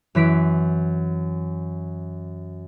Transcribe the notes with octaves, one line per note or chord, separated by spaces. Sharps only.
F#2 E3 B6 D7